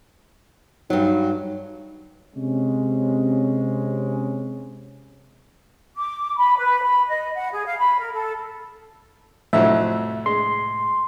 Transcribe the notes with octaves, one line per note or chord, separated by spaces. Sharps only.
G2 F#3 D#4
C3 G#3 C#4
D6
B5
B4
B5
D#5
F#5
G#4
F5
B5
A#4
A4
C2 F2 A2 F3 F#3 E5
G#3 C6